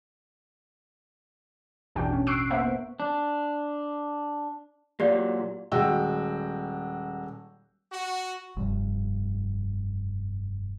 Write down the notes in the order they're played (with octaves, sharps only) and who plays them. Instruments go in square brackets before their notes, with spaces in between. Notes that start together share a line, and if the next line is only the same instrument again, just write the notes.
[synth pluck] A1 E2 B2 D4 F#4 G5
C#4
C#6 E6 F#6 C7 D7
A#3 B3 C5 E5 F#5
[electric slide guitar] D4
[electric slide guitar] A#2 F#3 [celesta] G4 D5 F5
[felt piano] D#1 G#3 F#4 G5 E6
[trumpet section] F#4
[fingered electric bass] F1 G2